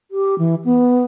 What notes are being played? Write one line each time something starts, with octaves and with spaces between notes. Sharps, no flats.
G4
E3
B3